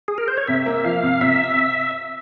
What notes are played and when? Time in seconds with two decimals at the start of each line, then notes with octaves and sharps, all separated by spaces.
0.08 G#4
0.18 A#4
0.28 C5
0.37 C#5
0.47 C3 E5
0.66 A#3
0.84 F3 F5
1.03 C3
1.21 C3 E5